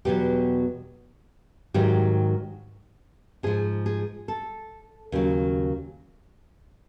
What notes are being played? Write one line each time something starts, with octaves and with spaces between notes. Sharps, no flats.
E2 B2 F#3 G4
G#2 D#3 F#3 G4
G#2 F3 G#4
G#4
A4
D#2 C#3 F#3